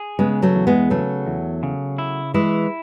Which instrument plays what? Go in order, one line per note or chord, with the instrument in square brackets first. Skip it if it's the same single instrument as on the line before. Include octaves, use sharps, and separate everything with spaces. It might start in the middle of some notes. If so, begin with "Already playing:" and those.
Already playing: [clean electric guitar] G#4
[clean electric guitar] C#3 [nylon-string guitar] G#3 B3
[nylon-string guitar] F#3 A3
[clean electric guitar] E2
[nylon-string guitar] G#3 B3
[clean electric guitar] C#3 [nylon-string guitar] F#3 A3
[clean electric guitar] E2
C#3
E4
[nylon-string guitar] E3 G#3 [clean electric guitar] E4